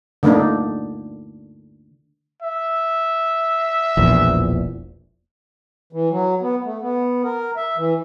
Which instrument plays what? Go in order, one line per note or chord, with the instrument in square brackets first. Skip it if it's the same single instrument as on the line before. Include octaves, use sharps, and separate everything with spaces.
[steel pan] D3 A3 A#3 D4 D#4
[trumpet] E5
[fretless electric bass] E1 A#1 E2
[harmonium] E3
F#3
B3
A3
B3
A#4
E5
E3